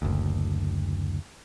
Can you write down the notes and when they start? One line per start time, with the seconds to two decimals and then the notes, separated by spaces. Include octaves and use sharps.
0.02 F#1 D2